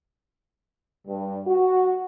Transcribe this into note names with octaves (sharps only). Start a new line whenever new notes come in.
G2
F#4